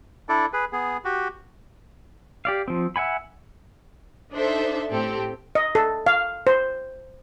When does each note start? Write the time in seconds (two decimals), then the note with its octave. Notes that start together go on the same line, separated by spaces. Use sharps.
0.29 D4 E4 A4 D5
0.53 G#4 B4
0.72 B3 G#4
1.05 F#4 G4
2.45 G4 D5 F5
2.68 F3 C4
2.96 E5 F#5 G#5 B5
4.33 D4 D#4 A4 C5 E5
4.90 A2 C4 G4 A4
5.55 D#5
5.75 A4
6.06 F5
6.47 C5